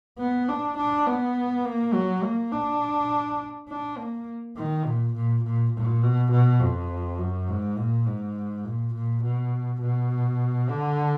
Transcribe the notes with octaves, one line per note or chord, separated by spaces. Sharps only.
B3
D4
D4
B3
A#3
F#3
A#3
D4
D4
A#3
D#3
A#2
A#2
A#2
A#2
B2
B2
F2
F#2
G#2
A#2
G#2
A#2
A#2
B2
B2
D3